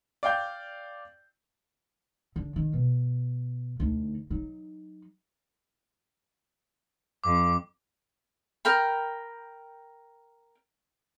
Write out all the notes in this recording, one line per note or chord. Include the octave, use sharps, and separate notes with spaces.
D5 F5 G5 G6
D3
D#3
B2
D2 D#4
F#3 D#4
F2 D6
A#4 G5 B5